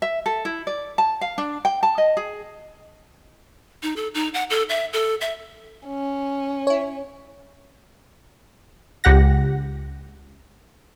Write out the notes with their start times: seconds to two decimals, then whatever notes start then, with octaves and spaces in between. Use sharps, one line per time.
0.02 E5
0.26 A4
0.45 E4
0.67 D5
0.98 A5
1.21 F5
1.38 D4
1.65 G5
1.83 A5
1.98 D#5
2.17 G#4
3.83 D#4
3.96 A4
4.14 D#4
4.34 F#5
4.50 A4
4.69 E5
4.93 A4
5.21 E5
5.87 C#4
6.67 E4 C#5
9.04 C#2 G4 F#5 A#6